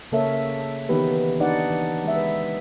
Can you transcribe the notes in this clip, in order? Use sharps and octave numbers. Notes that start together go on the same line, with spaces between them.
C#3 A#3 A4 A#4 C#5 E5
D#3 E3 B3 D#4 G4 B4
D4 D#4 B4 D5 F#5
E3
G#3 E5
B4